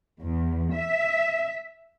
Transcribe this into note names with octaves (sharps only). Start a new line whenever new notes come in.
E2
E5